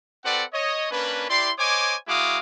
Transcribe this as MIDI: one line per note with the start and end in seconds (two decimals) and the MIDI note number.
0.24 0.44 60
0.24 0.44 66
0.24 0.44 69
0.24 0.44 71
0.24 0.44 74
0.24 0.44 78
0.53 0.88 73
0.53 0.88 75
0.91 1.28 58
0.91 1.28 61
0.91 1.28 62
0.91 1.28 71
1.29 1.51 64
1.29 1.51 67
1.29 1.51 74
1.29 1.51 84
1.58 1.95 72
1.58 1.95 73
1.58 1.95 75
1.58 1.95 80
1.58 1.95 86
2.08 2.39 56
2.08 2.39 64
2.08 2.39 66
2.08 2.39 77
2.08 2.39 86
2.08 2.39 87